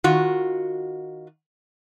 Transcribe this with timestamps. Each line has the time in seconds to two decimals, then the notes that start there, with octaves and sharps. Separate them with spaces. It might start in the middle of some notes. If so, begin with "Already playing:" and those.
0.04 D#3 F4 F#4